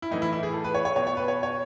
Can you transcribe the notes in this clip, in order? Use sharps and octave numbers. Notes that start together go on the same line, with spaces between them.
E4
A2 E3 D#4
E4
E4
G#4
A4
B4
C#5
C#5
B2 C#5
C#5
B4
C#5
C#5